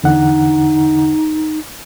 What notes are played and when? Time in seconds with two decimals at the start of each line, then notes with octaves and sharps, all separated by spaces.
0.04 E2 D3 D#4 F#5